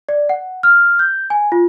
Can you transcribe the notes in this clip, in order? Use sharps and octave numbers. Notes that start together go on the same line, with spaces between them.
D5
F#5
F6
G6
G#5
F4